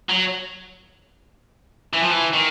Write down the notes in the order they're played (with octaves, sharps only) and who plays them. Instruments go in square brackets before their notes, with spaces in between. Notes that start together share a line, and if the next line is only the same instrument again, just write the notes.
[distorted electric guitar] F#3
E3
F3
E3
D#3